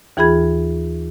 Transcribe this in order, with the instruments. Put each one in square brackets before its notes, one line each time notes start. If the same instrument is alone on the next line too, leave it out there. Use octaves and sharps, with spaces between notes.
[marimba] D#2 E3 F4 G#4 B5 G#6